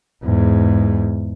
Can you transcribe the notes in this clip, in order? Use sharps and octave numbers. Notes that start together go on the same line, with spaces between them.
E2 G#2